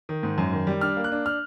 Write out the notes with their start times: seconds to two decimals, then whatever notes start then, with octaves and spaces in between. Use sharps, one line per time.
0.09 D#3
0.23 G#2
0.38 F#2
0.53 D#3
0.67 G3
0.81 D4 F6
0.96 A#3
1.04 F#6
1.12 D4
1.26 F6